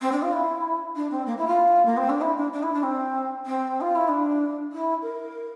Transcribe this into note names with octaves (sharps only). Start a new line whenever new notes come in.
C4
D4
F4
E4
D4
C4
A#3
E4
F4
A#3
C4
D4
E4
D4
D4
E4
D4
C4
C4
F4
E4
D4
E4
A#4